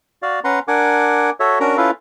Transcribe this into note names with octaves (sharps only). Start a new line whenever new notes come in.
F#4 D5 F5
C#4 B4 F#5 A#5 C6
D4 A#4 F#5 G#5 D6
F#4 A4 C#5 E5
C#4 D4 F#4 A#4 A#5
C#4 E4 F4 A4 B4 F5